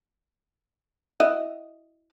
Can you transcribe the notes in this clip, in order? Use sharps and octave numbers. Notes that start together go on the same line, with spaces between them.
E4 F#4 D#5